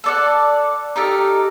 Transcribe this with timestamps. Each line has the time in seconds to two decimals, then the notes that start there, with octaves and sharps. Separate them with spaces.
0.04 A4 D5 F#5
0.96 D#4 G4 A4 A#4